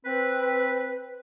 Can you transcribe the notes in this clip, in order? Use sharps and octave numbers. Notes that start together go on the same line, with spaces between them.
C4 B4